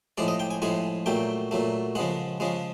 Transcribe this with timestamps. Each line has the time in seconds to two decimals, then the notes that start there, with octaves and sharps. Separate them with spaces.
0.18 A2 F3 G#3 D5
0.28 D#5
0.40 G5
0.51 G#5
0.62 A2 F3 G#3 G#5
1.06 A#2 F#3 A3 G5
1.51 A#2 F#3 A3
1.95 C#3 F3 G#3 F#5
2.40 C#3 F3 G#3